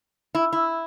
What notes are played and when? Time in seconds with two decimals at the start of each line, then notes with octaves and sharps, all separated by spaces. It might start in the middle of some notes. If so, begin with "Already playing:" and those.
0.35 E4
0.53 E4